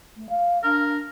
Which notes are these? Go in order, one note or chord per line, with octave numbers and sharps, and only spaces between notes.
A3
F5
D4 A#4